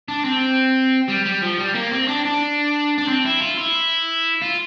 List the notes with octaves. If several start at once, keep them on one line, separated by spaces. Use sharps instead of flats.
D4
C4
G3
G3
F3
G3
A#3
C4
D4
D4
D4
C4
E4
F4
E4
F4